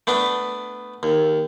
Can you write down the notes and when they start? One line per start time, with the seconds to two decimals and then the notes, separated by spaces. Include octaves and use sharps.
0.07 A3 B3 D4
1.03 D#2